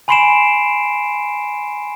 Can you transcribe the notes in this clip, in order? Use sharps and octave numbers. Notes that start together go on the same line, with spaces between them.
G#5 B5 C6 C7 D7 E7